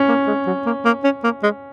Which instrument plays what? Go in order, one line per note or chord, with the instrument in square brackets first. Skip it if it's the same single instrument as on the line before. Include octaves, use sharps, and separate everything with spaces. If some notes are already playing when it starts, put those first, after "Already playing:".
Already playing: [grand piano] C#4
[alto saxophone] A#3
G#3
F#3
A#3
A#3
C#4
A#3
G#3